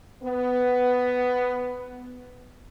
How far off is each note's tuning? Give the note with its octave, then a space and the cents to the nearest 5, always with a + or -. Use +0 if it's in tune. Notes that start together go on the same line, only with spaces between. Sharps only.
B3 +10